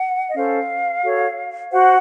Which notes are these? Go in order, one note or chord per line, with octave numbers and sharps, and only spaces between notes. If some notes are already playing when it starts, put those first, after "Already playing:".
Already playing: F#5
D#5
C#4 A4 C5 F5
F#4 A4 C#5
F#4 C5 F#5